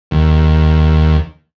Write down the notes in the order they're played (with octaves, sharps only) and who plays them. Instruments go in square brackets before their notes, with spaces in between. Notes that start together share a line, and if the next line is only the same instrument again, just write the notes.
[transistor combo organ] D#2